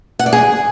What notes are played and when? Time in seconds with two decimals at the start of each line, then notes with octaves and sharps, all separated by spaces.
0.19 F#5
0.26 D5
0.33 G#4